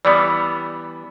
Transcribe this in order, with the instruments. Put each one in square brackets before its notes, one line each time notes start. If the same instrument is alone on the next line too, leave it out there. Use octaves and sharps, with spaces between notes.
[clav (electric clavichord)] E3 G3 B3 [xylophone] D5